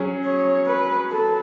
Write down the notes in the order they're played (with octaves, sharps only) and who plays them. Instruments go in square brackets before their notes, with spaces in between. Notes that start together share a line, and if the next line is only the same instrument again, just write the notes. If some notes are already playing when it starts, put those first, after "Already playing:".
Already playing: [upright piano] F#3 C#4 G#4
[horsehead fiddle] C#5
B4
A4